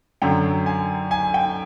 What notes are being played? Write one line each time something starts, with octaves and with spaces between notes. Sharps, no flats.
F#2 D3 F#3 G5
G#5
G#5
G5